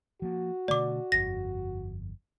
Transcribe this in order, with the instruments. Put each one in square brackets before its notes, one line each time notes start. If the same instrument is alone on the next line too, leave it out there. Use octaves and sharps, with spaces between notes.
[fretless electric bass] F3 A#3 [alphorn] F#4
[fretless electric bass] B2 D3 A3 [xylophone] D5 D6
[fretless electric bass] G1 F2 [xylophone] A#6